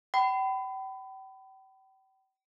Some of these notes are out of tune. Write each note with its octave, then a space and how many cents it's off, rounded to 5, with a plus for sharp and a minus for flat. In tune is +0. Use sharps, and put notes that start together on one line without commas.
G5 -40 B5 +20